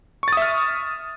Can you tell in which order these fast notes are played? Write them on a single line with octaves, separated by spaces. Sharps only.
C#6 A6 D#6 E5 F6